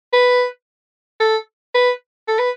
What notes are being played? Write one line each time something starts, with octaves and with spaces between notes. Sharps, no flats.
B4
A4
B4
A4
B4